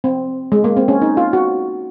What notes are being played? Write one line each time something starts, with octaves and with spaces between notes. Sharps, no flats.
C4
G#3
A#3
C4
C#4
D#4
F4
F#4